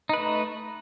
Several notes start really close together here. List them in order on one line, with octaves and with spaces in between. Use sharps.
D#4 B4 A3